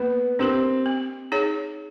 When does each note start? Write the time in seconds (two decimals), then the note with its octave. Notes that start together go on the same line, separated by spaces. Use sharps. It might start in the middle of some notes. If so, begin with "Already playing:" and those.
Already playing: A#3 B3
0.39 C4 D4 G4 A#4
0.86 C4
1.32 D#4 G#4 C#5